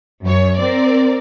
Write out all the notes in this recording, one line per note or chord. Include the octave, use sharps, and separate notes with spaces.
F#2 C#5
C4 A#4 D5